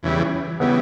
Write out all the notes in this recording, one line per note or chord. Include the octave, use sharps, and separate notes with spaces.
E2 C#3 E3 G3
C#3 E3 G3 B3